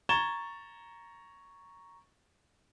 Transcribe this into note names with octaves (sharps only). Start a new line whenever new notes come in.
A#5 C#6 G#6 A6 E7 G7